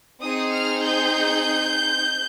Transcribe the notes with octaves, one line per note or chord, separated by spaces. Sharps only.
C4 D#4 G#4 D#6
F6
G6